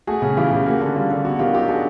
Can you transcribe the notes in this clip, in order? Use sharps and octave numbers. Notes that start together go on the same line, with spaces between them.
A3 F#4 G#4
C#3
E3 F4 G4
C#3 G4
A#3 F#4
D3
G3 F4
D3
B3 F#4
D#3 F4 G4
F#3 F4 G4
D4 F#4 G#4